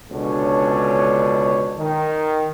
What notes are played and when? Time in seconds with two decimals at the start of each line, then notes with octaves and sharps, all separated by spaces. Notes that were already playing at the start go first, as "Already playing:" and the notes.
0.11 C#2 B2 D3 C#4 D4 C#5
1.77 D#3